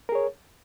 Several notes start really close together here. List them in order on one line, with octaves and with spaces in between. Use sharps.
A#4 G#4 C#5